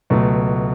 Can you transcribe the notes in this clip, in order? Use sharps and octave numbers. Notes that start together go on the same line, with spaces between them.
C#2 B2 F#3 A3